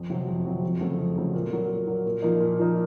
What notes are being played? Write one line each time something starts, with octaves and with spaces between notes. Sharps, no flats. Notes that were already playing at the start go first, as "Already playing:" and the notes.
Already playing: F2
C3 F#3 C4 F#4
F2
C3 F#3 C4 F#4
F2
C#3 F#3 A3 C4
F2
C#3 F#3 A3 C4
A#2
F#3 A#3
A#2
F#3 A#3
A#2
F3 A#3 D#4
A#2
F3 A#3 D#4